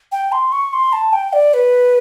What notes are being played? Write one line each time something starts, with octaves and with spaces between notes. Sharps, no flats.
G5
C6
C#6
C6
A5
G5
D5
B4